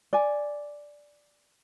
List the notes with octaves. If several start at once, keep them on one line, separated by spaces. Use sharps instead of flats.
D5 G#5